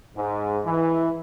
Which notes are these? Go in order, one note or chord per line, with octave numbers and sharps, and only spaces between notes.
G#2
E3